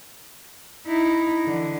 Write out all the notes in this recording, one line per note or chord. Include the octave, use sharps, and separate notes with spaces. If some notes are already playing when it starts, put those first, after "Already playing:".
D#4 E4
D3 E3